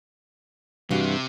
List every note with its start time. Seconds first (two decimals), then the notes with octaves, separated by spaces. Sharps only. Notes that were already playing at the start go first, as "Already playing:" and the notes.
0.91 G2 C3 E3 F#4 F5